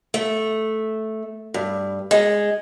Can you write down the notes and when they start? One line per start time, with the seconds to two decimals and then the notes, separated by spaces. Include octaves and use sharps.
0.14 A3
1.54 G2
2.11 G#3